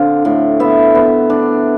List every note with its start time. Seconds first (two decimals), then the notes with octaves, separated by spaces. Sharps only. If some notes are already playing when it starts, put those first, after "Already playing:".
Already playing: D3 C4 D4 F5
0.25 A2
0.60 B3 E5
0.95 B3
1.30 D4